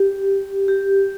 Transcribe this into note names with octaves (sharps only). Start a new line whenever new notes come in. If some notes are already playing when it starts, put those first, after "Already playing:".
Already playing: G4
G4